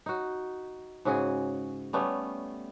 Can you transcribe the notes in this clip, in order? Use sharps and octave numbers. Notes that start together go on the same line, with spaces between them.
D#4 F#4
G#2 C#3 F#4 G#4
G3 A3 B3 C#4